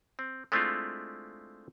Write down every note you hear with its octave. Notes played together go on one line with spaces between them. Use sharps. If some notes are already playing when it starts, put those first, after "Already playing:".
C4
G#3 A3 C4 D4 E4 F4